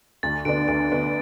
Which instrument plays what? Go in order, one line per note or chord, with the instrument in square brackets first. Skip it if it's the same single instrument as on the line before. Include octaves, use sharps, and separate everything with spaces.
[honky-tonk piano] D2 [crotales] A6
[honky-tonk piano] D3 B3 D4 [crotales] D7
[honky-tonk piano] D2 [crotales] D7
[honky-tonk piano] D3 B3 D4